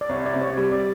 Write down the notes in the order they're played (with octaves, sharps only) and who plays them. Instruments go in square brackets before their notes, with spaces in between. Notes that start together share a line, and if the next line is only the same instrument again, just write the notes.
[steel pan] D5
[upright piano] C2 [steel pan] C#5
[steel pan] D5
[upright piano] C3
[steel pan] C#5
[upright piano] G3 [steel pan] D5
[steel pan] D5